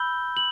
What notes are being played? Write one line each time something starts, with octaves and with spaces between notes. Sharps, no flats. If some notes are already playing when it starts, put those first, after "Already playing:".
Already playing: B5 E6 G6 G7
F#7